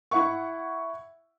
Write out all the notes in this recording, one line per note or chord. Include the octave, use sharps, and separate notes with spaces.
E4 E5 F#5 C#6